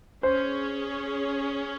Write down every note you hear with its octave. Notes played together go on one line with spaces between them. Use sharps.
C#4 G#4 C5 C#5